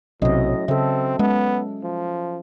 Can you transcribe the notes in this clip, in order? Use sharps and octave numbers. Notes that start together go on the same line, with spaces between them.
B1 A2 C3 F#3 C#4 D#5
C#3 C4 A4 E5
G#3 B3 C#4
F3